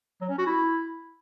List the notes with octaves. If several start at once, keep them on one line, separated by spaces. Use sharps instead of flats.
F#3
C#4
F#4
E4